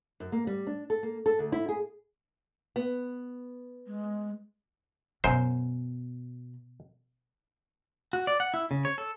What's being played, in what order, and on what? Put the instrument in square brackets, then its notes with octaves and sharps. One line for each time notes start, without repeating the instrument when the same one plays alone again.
[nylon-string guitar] F#2
A#3
G3
D4
A4
A#3
A4
D2
E4
G#4
B3
[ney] G#3
[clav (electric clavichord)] F#2 C5 [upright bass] B2
[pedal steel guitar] F#4
D5
F#5
E4
C#3
C#5
A4